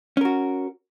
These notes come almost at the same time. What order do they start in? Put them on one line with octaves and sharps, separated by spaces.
C#4 A#4 F#4